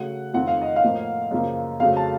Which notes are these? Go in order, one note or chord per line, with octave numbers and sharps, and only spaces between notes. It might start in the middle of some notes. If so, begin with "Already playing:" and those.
Already playing: C#3 F#3 A3 F#5
F2 D#3 A3 C4 F4 F#5
F5
D#5
F5
A2 F3 A#3
F#2 C#3 F3 A#3
F2 C#3 F#3 A3 F5
A5